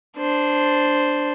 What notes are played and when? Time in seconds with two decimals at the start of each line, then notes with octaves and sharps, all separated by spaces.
0.17 D4 C5